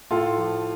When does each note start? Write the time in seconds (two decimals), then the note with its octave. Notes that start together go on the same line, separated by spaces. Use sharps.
0.11 A2 F4 A4
0.38 F3